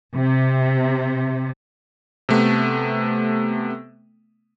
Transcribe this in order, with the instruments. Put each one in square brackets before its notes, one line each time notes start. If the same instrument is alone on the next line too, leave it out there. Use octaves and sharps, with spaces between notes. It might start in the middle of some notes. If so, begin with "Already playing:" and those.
[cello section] C3
[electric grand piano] C3 A3 B3